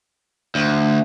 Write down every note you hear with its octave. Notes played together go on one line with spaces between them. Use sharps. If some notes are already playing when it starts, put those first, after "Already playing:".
D2